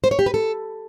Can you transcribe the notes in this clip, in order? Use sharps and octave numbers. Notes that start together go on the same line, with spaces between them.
C5
C#5
G4
B4
A4